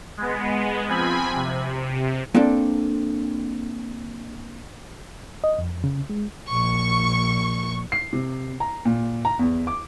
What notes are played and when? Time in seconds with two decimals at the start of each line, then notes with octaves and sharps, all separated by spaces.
0.17 G#3 B3
0.88 F3 C4 G#5 B5
1.35 C3
2.35 A#3 C4 D4 A4
5.44 D#5
5.59 F2
5.84 C#3
6.10 G#3
6.48 A#1 C#6
7.92 C7
8.13 C3
8.60 A#5
8.85 A#2
9.25 A#5
9.39 E2
9.67 D6